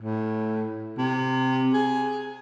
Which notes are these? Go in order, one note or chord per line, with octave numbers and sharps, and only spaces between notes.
A2
C3
G#4